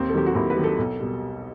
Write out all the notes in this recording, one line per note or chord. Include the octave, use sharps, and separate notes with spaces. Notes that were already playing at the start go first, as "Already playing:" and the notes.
Already playing: D#2 C4
A4
D#3 F#3 G4
F#4
D#2 E4
B4
D#3 F#3
A4
B1
B2 G3